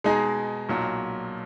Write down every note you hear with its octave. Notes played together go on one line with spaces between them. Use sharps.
B2 G#3 D#4 G#4
B1 A#2 F#3